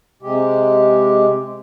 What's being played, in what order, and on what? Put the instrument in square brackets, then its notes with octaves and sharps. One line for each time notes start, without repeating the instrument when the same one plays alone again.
[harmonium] C3 G#3 G4